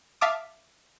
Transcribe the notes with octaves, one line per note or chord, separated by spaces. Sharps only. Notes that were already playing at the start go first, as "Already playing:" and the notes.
E5 F5 A5 D6 D#6